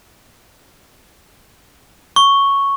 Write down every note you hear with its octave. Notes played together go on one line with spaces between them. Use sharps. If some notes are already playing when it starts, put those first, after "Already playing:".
C#6